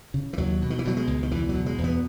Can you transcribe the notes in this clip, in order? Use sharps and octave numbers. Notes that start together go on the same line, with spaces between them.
C#3
E3
D#2 F#3
B2
D#3
E3
B2 F#3
G#3
C#2
D#3
E2 E3
F#3
B2
G#3
E2
B3